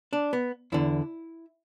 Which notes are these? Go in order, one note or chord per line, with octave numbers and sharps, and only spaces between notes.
D4
B3
E2 D3 E4